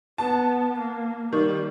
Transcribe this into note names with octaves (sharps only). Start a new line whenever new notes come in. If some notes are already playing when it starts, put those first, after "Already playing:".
B3 A5
A#3
D#3 G3